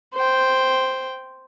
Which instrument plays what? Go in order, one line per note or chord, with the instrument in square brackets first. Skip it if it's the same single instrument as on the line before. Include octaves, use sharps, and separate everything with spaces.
[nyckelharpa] C5 G5